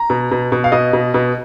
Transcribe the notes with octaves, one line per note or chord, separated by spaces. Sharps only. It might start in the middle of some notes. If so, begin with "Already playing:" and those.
Already playing: A#5
B2
B2
B2
F5
B2 D#5
B2
B2